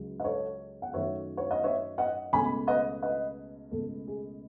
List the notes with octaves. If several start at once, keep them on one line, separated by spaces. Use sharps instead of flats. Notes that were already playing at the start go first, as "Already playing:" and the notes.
Already playing: C#2 C#3 F#3
D#5
A4 C#5
F#5
F#2 D#3 F#3 A3 C#5 E5
C#5
D#5
C#5 E5
D#5 F#5
C#2 B2 A3 C#4 G#5 B5
B4 D#5
B4 D#5
C#2 B2 A3 A4
G#4